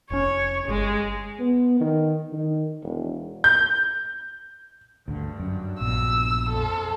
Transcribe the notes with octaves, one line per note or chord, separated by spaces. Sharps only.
F1 C#4 C#5
G1 G#3
B3
D#3
D#3
E1
G6
D2 G2 D3
F#2
A#1 B2 E6
F2 A4